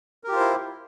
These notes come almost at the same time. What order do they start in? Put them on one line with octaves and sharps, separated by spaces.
A#4 G4 F4 C5 E4